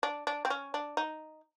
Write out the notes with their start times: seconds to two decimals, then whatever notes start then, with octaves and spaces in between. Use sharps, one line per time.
0.03 D4
0.27 D4
0.45 C4
0.50 C#4
0.74 D4
0.97 D#4